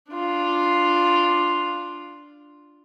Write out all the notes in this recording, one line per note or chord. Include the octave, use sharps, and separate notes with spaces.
D4 F4